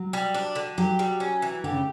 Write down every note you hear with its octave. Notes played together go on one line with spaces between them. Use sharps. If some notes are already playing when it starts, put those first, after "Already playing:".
Already playing: F#3
G3
D4
D3
F#3 G4
G3
C#4
E3
D3 G4
C#3